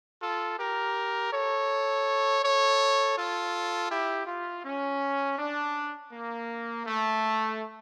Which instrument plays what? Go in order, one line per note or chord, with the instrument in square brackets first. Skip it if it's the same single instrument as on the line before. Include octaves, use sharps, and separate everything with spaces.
[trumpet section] F4 A4
G4 A#4
A4 C#5
A4 C#5
F4 A4
E4 G4
F4
C#4
D4
A#3
A3